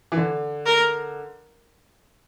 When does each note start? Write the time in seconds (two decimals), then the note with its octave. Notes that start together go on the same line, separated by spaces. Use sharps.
0.12 E3
0.17 D3
0.66 A#4